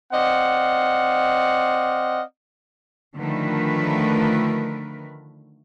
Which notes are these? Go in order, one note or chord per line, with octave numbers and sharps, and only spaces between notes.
C4 D5 D#5 F5 F#5
D3 D#3 F3 A3 A#4 B4